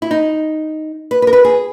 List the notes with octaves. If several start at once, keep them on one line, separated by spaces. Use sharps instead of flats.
E4
D#4
B4
B4
A#4
B4
G#4